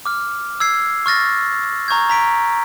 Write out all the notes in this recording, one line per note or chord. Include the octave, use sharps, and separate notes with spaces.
D6 F6
E6 G#6 C7
C#6 F6 A6 A#6
A#5 C#6 G6 G#6
A#5 B6 D7